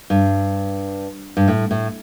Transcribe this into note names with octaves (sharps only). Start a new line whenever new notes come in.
G2
G2
A2
A2